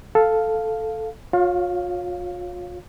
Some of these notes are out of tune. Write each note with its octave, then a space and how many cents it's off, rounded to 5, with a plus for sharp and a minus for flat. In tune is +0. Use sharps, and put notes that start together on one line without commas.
A4 +0 F5 +0
F4 +40 C#5 +0 F5 +5